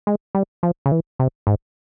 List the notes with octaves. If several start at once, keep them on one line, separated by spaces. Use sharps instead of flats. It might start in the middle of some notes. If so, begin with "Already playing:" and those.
G#3
G3
F3
C#3
E3
C3
G#2